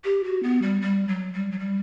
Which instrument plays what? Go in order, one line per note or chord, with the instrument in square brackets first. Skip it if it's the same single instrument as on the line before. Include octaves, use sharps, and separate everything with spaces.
[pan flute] G4
F#4
B3
G3
G3
F#3
G3
F#3
G3